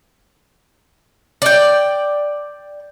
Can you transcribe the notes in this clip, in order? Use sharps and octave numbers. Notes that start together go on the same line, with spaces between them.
D5 G5